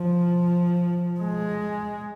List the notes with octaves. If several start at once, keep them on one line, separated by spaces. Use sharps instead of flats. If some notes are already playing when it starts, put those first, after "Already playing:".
Already playing: F3
G#3